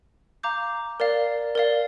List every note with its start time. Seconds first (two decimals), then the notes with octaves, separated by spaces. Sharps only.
0.43 F5 A#5 D6 G6
1.00 A#4 D5 F5
1.55 A#4 D5 F5